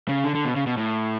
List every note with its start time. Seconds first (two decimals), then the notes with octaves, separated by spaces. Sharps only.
0.09 C#3
0.24 D3
0.35 D3
0.45 B2
0.56 C#3
0.66 B2
0.77 A2